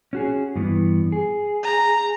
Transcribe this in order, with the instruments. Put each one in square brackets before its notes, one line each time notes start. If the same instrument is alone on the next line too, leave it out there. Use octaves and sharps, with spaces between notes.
[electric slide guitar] C#4 F#4 G#4
G2 E3 B3
G#4
[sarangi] A#5